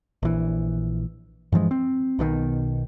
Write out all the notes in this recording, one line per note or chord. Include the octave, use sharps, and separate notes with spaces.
A#1 E3
G2 E3 F3 G#3
C4
B1 B2 D#3